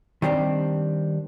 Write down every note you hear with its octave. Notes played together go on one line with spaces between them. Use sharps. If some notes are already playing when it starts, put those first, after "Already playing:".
D#3 G3 C4 D4